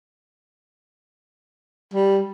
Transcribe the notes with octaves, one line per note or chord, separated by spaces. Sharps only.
G3